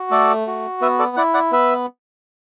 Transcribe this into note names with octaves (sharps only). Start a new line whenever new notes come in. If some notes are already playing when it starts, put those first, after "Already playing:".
Already playing: F#4
A3 A4 D5
F#4
B3 B4 E5
A4 D5
E4 D5 F#5
D5 F#5
B3 B4 E5